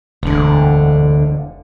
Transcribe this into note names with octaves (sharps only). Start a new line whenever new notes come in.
E1 D2 D3